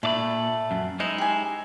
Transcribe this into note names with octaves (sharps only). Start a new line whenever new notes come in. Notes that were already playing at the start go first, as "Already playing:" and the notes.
A#2 A3 D4 D5 B5
F#2
G#3 D#4 E4 D#5
G4 G#5